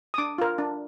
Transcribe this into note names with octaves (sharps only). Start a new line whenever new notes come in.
D#6
D4 D6
F4 A#4
D4